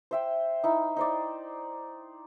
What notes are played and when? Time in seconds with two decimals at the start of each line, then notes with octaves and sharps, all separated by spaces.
0.11 C5 E5 G5
0.64 D#4 E4
0.96 D#4 C5 D5